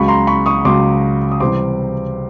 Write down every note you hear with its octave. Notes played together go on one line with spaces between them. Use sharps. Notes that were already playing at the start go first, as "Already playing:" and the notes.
Already playing: C#2 C#3 F#3 B5 C#6
A#5 C6
B5 C#6
C#6 D#6
C#2 C#3 F#3 C6 D6
D#6
C3 E3 G3 C4 C6 D6